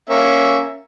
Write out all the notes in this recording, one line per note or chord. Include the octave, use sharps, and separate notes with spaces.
A#3 C#4 E5